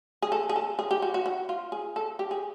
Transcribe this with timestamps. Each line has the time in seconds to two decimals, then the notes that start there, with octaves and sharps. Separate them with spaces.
0.22 G#4
0.32 A4
0.49 G#4
0.56 A4
0.79 G#4
0.91 G4
1.02 F#4
1.14 F#4
1.26 F#4
1.49 F4
1.72 G#4
1.96 A4
2.19 G4
2.31 G#4